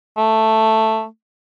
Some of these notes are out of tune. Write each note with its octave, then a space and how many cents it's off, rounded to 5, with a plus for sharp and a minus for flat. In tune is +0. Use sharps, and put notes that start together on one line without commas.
A3 +5